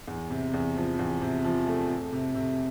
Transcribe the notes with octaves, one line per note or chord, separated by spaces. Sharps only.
E2
C3
E2
F3
E2
C3
F3
A3
F2
C3
C3